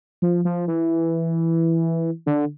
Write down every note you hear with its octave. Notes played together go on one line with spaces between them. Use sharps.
F3
F3
E3
D3